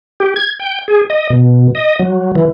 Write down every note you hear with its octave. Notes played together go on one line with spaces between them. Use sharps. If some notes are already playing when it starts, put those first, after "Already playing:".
G4
G#6
G5
G#4
D#5
B2
D#5
F#3
E3